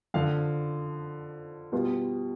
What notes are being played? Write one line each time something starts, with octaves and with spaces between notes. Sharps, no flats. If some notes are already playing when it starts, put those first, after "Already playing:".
F2 D3 F3 F5
B2 G3 B3 F4